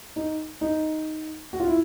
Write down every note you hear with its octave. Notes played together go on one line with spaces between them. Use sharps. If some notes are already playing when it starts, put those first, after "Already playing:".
D#4
D#4
F#4
F4
E4